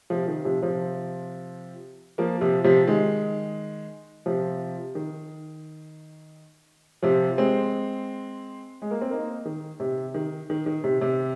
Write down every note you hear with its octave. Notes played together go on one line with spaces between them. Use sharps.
C3 F3
D#3
C3 F3
C3 F3
F3 A#3
C3 F3
C3 F3
D#3 G#3
C3 F3
D#3
C3 F3
G#3 C4
G#3
A#3
C4
A#3 D#4
D#3
C3
D#3
D#3
D#3
C3
C3